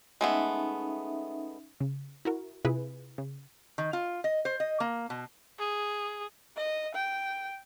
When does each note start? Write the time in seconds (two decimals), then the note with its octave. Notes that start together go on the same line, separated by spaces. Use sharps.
0.21 G#3 A3 B3 C#4 D#4 E5
1.80 C#3
2.25 E4 F#4 A#4
2.65 C3 E4 F4 G#4 B4
3.18 C#3
3.78 D#3
3.93 F4
4.24 D#5
4.45 C5
4.60 D#5
4.80 A#3
5.10 B2
5.58 G#4
6.56 D#5
6.95 G5